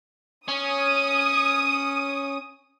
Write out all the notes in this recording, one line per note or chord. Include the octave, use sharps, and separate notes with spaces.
C#4 D#6